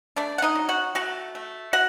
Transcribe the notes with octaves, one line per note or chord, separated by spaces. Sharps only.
A3 D4 D5
F#5
D#4 D#5
F#3
F#4 F#5
A3 F#4 F#5
A3
F#4 F#5